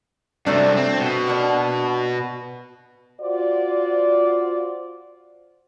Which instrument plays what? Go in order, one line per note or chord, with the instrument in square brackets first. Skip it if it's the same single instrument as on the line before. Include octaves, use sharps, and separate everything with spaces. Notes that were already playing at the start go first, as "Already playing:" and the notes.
[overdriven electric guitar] G2 C3 [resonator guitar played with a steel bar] F#3 A3 D4
[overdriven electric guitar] C4
B2
[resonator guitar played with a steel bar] A#3 D4
[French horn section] F4 F#4 C5 D5